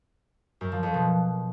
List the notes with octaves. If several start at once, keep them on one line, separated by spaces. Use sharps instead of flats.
F#2
F3
F2
B2